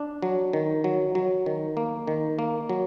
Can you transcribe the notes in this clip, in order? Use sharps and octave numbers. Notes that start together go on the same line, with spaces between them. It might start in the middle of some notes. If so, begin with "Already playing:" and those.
Already playing: D4
F#3
D#3
F#3
F#3
D#3
A#3
D#3
A#3
F#3